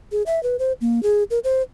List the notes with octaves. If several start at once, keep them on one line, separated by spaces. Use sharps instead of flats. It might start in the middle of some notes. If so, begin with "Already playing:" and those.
G#4
E5
B4
C5
A#3
G#4
A#4
C5